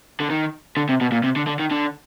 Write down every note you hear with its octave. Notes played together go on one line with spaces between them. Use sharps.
D3
D#3
D3
C3
B2
A#2
C3
D3
D3
D#3
D3